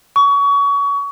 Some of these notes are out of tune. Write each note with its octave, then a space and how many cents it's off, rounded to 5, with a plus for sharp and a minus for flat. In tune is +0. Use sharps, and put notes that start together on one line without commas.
C#6 +30